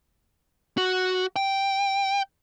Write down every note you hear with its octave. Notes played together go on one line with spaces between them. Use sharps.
F#4
G5